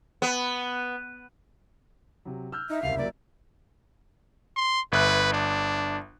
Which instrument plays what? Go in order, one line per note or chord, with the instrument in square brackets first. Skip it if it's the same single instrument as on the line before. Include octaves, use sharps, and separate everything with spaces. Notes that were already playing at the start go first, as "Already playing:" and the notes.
[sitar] B3
[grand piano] C3 F#3
E6 F6 G6
[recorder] D#4 [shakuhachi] E5
[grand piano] F#1 C2 [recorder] F5
[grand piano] F#3 A#3 [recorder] D5
[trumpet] C6
[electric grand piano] G1 E5 F#6 [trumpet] B4
[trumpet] D4